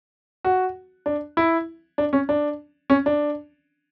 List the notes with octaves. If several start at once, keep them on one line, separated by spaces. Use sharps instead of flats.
F#4
D4
E4
D4
C#4
D4
C#4
D4